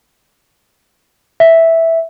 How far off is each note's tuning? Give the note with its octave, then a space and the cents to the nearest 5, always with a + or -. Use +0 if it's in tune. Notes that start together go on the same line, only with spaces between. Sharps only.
E5 -5